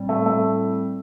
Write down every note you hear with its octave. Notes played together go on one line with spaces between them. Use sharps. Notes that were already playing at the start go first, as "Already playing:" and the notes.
Already playing: A2 G3 C4
A3
A3